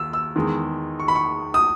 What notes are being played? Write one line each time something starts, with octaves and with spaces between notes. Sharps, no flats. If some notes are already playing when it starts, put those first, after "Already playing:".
Already playing: D#2 E6
E6
E2 D#3 G#3
C#6
B5
C#6
D#6